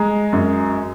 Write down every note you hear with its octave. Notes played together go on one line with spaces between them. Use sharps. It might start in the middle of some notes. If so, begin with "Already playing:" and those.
Already playing: G#3 A#5
F#2